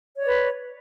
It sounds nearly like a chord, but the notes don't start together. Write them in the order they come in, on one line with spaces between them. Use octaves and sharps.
C#5 D5 B4